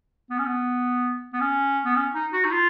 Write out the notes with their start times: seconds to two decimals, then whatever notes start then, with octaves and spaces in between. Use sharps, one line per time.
0.30 B3
0.38 C#4
0.46 B3
1.33 B3
1.40 C#4
1.85 B3
1.96 C#4
2.14 D#4
2.33 F#4
2.44 D#4
2.51 F4